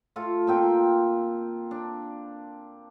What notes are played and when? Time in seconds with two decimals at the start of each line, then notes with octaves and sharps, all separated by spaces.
0.16 A3 F4 A4
0.47 A#2 C4 G5
1.71 D4